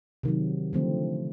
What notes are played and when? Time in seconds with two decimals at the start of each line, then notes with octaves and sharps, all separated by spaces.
0.23 C3 D#3 F#3
0.73 D3 F3 A3 C4